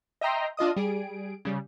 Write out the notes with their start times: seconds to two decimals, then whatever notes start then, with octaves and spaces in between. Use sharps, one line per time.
0.21 D#5 E5 G5 A#5 C6
0.57 D4 F4 D#5 D#6
0.76 G3 G#4 D7
1.45 C#3 G3